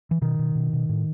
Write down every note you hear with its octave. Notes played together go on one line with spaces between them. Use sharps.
E3
B2 D#3
B2
B2
B2
A2